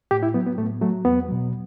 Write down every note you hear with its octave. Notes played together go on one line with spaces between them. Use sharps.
A2 G4
E4
F#3 B3
B3
A2 A3
F#3 A3
E2 B3
B2 F#3